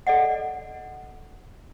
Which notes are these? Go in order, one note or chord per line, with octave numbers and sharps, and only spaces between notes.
A4 D5 D#5 F#5